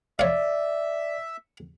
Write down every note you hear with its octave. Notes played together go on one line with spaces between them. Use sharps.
C#5 D5 E5 F5